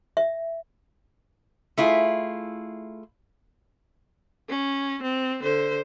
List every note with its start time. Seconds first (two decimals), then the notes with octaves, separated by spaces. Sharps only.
0.17 E5
1.78 A3 E4 F4 G#4
4.49 C#4
5.03 C4
5.42 D3 C5